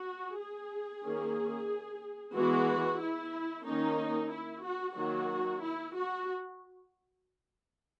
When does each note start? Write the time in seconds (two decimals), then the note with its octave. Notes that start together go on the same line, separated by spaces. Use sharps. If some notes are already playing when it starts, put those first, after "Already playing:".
Already playing: F#4
0.38 G#4
1.04 D#3 A#3 C#4
2.34 E3 G#3 B3 F#4
3.00 E4
3.65 D#3 A#3 C#4 D#4
4.32 E4
4.64 F#4
4.96 D#3 F#3 A#3 F#4
5.62 E4
5.95 F#4